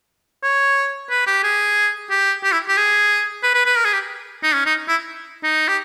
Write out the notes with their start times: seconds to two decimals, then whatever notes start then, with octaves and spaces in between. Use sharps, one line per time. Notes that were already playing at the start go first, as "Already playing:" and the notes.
0.43 C#5
1.10 B4
1.27 G4
1.43 G#4
2.10 G4
2.43 G4
2.52 E4
2.68 G4
2.77 G#4
3.43 B4
3.54 B4
3.66 B4
3.77 A#4
3.85 G#4
3.93 G4
4.43 D#4
4.54 C#4
4.66 D#4
4.88 E4
5.43 D#4
5.68 G4